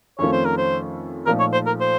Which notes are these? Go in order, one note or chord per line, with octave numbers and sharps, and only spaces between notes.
F2 D#3 A3 C#4 F4 C#5
C5
A#4
C5
A#2 F3 A3 D#4 A4 A#4
C#5
C5
A#4
C5